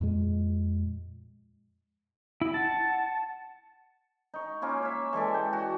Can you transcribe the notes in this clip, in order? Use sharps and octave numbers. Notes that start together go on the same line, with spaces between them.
F2 A#2 G#3
E4
F#5 A5
D#4 C#6
A#3 C#4 E4 F4
C#5 E5
E3 G#3 A4 D5
G5
F#4